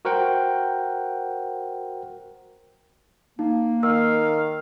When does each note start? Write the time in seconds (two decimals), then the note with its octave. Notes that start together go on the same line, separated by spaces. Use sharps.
0.05 F#4 A#4 C5 F#5 G5
3.39 A#3 D#4
3.83 D#3 F5 E6